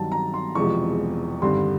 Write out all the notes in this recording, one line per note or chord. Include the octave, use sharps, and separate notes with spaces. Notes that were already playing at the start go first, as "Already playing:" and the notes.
Already playing: G2 D#3 F#3 A5
A#5
C6
E1 E2 C3 F3 G#3 C#6
G#1 G2 D3 G3 C6